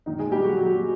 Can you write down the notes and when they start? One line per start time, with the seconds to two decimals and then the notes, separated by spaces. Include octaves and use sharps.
0.06 A#2 D#3 D#4
0.19 G#3 G#4
0.31 A#2 G3 G4
0.44 F#3 F#4
0.57 A#2 F#3 F#4